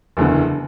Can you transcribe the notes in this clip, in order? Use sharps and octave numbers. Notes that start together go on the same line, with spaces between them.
F#1 E2 D3